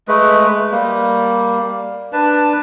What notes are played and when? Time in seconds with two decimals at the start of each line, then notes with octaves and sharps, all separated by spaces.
0.08 G#3 A3 B4
0.71 G3 A#3
2.13 D4 B4 A5